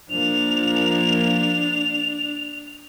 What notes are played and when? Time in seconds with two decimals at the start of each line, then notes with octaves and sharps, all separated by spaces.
0.10 F3 A#3 D4 F7